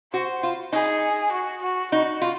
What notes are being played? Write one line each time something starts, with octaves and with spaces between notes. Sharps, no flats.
F#4 C5
F4
D#4 G#4
F#4
F#4
D#4 F#4
F4